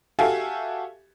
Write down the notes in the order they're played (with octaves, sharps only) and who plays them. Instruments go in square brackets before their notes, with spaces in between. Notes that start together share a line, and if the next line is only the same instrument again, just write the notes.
[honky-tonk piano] F#4 G4 A4 E5 F5 G#5